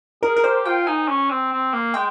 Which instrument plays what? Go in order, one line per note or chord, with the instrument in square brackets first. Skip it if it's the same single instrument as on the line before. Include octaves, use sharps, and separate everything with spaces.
[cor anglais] G#4 [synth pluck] A#4
[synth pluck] A#4
[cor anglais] G4 [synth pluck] C5
[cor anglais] F4 [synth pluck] G5
[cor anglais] D#4 [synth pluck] G#5
[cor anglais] C#4
C4
C4
A#3
[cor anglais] G#3 [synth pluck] G5